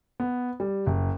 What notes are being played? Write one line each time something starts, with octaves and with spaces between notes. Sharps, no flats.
B3
G3
F#1